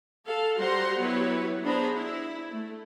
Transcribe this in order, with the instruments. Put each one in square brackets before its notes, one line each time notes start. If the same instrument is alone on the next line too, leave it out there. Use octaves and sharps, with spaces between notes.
[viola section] A4 F5
G3 F#4 C5 F#5 A#5 C6
F#3 B3 E4 G4 B4 C#5
B3 D4 G#4 C5 A#5 B5
E4
A3